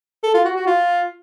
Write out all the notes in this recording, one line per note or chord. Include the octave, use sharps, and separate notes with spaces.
A4
F4
F#4
F#4
F4